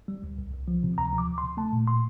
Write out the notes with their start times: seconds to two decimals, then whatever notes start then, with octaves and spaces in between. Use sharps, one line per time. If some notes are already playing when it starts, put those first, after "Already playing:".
0.08 G3
0.23 D2
0.38 C2
0.53 C2
0.68 F3
0.83 C3
0.98 D2 A#5
1.13 F3
1.18 D6
1.28 D2
1.38 C6
1.43 C3
1.57 A3 A5
1.72 A#2
1.87 A#2 C6